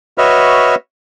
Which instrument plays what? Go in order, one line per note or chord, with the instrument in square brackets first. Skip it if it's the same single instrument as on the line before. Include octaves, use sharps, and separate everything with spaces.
[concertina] F#4 B4 C#5 D#5 E5 F6